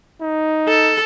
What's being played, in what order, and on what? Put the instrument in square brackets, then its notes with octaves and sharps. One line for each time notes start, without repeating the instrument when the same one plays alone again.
[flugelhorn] D#4
[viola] A4